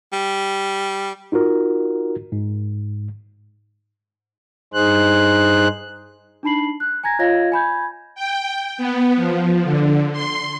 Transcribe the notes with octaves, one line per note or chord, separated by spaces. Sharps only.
G3
D#4 F4 F#4 A#4
G#2
G2 D#4 G#4 C5 F#6
D4 D#4 A5 B5 C7 F#7
F#6
G#5 A#5 G#6 A#6
F4 C#5 D#5 F5 G#6 A#6
G#5 B5 G6 G#6
G5
B3
F3
D3
C6